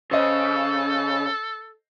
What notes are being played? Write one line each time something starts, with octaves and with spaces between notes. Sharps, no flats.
C#3 A4 C5 D#5